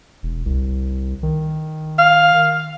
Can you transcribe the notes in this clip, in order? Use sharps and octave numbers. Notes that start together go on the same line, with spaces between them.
E1
C2
D#3
F5